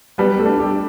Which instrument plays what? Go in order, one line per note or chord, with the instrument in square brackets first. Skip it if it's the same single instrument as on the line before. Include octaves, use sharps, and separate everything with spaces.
[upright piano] G3 [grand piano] B3 B4
[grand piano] A3 A4
[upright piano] D4
[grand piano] G3 G4